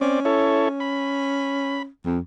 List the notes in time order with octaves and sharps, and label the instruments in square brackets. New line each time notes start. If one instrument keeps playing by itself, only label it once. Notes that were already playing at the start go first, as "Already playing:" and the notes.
[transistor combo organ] C4 D5 [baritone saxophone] C#4
[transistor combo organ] E4 A4 C#5
B5
[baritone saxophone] F2